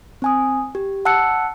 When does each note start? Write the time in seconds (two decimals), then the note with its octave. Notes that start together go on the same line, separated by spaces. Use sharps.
0.22 C4 G#5 D#6
0.75 G4
1.05 F#5 A5 E6 F#6 C#7